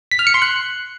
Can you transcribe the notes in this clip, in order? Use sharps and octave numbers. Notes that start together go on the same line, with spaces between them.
B6
F6
C#7
C6
F#6